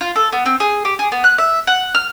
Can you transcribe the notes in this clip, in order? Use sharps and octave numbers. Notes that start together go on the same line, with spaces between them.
F4
A4
B3
C4
G#4
G4
G#4
B3
F#6
E5
F#5
F6